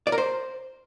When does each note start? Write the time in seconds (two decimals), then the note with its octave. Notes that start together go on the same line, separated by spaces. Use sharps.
0.07 D5
0.12 A#4
0.18 C5